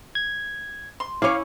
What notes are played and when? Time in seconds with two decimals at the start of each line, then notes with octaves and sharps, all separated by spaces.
0.15 G#6
1.00 C6
1.22 C#4 E4 C#5 F5 D6